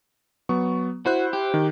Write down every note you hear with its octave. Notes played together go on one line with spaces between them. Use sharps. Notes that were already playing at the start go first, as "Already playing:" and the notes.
F#3 B3 C#6
E4 F#4 C5 F#6
G4
D#3